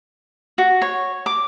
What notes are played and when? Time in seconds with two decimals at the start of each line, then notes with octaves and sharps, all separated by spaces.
0.58 F#4
0.82 C#5
1.26 D6